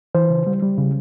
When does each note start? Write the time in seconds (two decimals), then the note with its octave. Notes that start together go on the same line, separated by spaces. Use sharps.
0.15 E3 C5
0.30 C#3
0.47 G3
0.62 G3
0.78 C#3